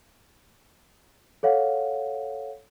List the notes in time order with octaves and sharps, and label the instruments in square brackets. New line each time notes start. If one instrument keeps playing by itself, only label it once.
[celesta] A4 C#5 F5 F#5